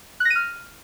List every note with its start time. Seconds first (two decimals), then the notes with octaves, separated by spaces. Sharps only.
0.20 F#6
0.25 A#6
0.30 D#7
0.35 F6